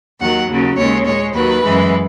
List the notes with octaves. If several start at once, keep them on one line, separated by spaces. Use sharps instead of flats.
D#2 D#3 F#3 F#5
D#2 C#3 F#3
D#2 C#3 G#3 C#5
A#2 G#3 C#5
D#2 D#3 F#3 B4
F#2 E3 G#3